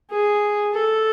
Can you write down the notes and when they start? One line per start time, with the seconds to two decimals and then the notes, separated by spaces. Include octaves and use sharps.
0.10 G#4
0.73 A4